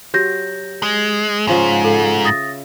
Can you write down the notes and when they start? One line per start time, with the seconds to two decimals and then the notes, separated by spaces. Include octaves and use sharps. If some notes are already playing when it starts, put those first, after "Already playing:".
0.14 F#3 G4 G6 A#6
0.83 G#3
1.47 G#2 C#3 F3 C#4
1.84 A4
2.25 E5 D#6 A6 A#6